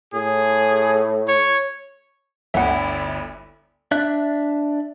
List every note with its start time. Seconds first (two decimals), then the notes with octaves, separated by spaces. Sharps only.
0.14 A2 G#4
1.28 C#5
2.54 G1 D2 E4 D5 E5 F#5
3.91 D4 E5 F#6